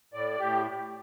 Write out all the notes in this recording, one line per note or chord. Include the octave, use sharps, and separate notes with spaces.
A2 D5
A2 G4